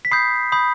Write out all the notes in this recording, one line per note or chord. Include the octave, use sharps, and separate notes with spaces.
B6
B5 D#6 G6 C7
B5 D#6 G6